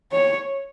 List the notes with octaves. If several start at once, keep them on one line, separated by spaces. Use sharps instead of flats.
C#5